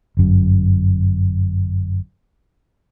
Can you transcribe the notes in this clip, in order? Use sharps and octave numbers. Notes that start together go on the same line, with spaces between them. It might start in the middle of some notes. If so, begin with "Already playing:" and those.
G1 F#2